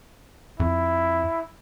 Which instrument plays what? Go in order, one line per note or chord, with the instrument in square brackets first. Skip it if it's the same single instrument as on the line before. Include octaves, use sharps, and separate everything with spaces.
[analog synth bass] F2 [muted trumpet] E4